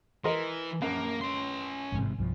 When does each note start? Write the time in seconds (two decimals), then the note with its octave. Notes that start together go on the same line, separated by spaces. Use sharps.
0.24 E3 A#4 D#5 C6
0.82 A#1 F#2 A#3
1.21 C#4 C6
1.92 A1 G#2 C3
2.18 B1 G2 F3